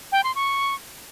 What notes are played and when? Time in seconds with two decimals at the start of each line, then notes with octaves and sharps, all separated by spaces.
0.12 G5
0.24 C6
0.35 C#6